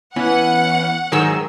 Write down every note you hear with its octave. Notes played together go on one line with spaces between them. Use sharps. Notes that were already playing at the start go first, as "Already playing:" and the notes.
E3 B3 C#4 F#5
G#2 D#3 F#3 G#4 A#4 E6